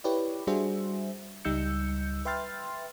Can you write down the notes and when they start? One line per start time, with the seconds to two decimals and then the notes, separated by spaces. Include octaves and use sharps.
0.04 E4 G4 B4 C#5 D5
0.47 G3 D4 F#4 G#4 C5 E5
1.45 C#2 G3 D#4 E6 G6 C#7
2.25 B4 E5 G5 C6 F6 A6